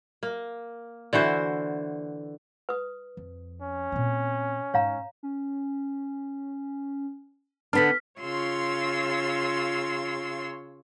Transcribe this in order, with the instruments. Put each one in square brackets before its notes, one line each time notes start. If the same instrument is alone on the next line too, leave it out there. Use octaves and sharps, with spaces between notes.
[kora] A#3
D3 E3 F#4 C5
[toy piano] B4 D#6
[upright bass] F2
[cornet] C#4
[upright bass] A#2 C4
[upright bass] G#2 [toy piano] C#5 F5 A#5
[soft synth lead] C#4
[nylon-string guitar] D3 B3 D4 [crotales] F6 B6
[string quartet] C#3 F4 C#5 C6 E6